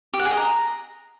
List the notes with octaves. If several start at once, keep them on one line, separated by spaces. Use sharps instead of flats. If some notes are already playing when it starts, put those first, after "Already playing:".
G4
F#5
G#4
D#5
A#5